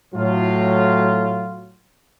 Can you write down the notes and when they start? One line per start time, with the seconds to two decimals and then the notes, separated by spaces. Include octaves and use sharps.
0.15 A2 F#3 F4